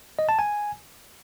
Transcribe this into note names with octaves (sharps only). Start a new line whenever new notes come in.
D#5
A5
G#5